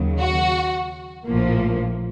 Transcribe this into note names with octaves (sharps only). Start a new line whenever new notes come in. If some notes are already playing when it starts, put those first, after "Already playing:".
Already playing: D#2 C#3 F#3
F#4
A#1 A2 F3 A#3